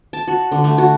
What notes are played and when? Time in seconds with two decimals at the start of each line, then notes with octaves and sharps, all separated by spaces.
0.13 A5
0.28 F#4
0.52 D3
0.64 A3
0.78 F#4